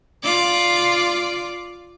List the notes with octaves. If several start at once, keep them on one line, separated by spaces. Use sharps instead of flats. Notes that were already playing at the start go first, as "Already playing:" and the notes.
F4 D5